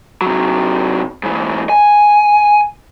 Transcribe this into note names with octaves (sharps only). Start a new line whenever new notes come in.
C3 F#3
G#2 E3
G#5